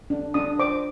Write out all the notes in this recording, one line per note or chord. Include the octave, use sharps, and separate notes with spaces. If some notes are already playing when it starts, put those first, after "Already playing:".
D4
D4 D#6
C5 D6